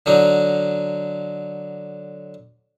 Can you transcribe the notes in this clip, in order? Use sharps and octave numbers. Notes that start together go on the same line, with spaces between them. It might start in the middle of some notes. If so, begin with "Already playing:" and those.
D3 F#3 D4 D#4